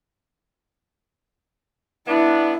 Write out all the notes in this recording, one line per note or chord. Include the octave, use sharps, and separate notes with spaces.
B3 D4 E4